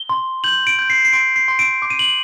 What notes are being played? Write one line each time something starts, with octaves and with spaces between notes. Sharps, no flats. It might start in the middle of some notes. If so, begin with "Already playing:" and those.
Already playing: G7
C6
G6 F#7
D7
G6
C7
C7
C6 D7
C7
C6
D7
D6
D#7
F#7